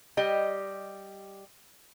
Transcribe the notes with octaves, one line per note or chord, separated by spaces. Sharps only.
G3 G4 D#5